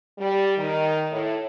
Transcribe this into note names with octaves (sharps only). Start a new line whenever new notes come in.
G3
D#3
A2